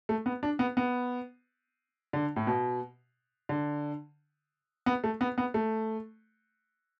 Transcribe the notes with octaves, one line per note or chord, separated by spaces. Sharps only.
A3
B3
D4
B3
B3
D3
A2
B2
D3
B3
A3
B3
B3
A3